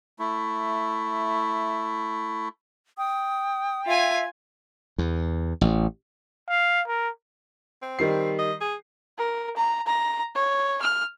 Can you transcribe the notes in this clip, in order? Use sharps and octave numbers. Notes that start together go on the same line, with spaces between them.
A3 E4
G5 D#6
F4 E5 G#5
E2
A1
F5
A#4
C4
D#3 G3 C7
D#5
G#4
A#4
A#5
A#5
C#5
F6